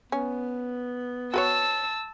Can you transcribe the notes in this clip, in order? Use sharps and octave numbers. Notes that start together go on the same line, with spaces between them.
B3 C#4
F#4 B4 C#5 A5 E6